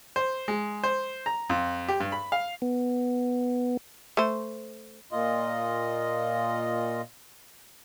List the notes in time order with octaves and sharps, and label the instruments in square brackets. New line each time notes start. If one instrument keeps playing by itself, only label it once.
[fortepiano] C5
G#3
C5
A#5
F2
G4
G2
B5
F5
[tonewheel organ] B3
[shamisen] A3 C5
[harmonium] A#2 F4 D#5